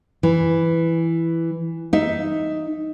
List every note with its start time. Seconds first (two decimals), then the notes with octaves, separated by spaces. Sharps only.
0.23 E3
1.93 D#4 E5